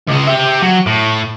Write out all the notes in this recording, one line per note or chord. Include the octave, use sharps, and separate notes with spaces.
C#2 G#3
G4 E5
F#3
A2